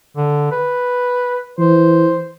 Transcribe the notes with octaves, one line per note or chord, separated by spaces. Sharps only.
D3
B4
E3 C5